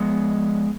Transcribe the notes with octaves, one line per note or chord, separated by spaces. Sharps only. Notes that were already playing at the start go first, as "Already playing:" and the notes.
Already playing: F3 G#3 B3